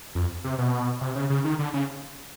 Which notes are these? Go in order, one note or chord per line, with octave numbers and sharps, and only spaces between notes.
F2
C3
B2
C3
C#3
C#3
D#3
D3
C#3